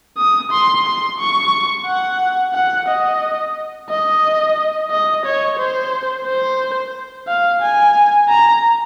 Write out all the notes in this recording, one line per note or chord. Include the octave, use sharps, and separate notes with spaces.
D#6
C6
C6
C#6
F#5
F#5
D#5
D#5
D#5
C#5
C5
C5
F5
G#5
A#5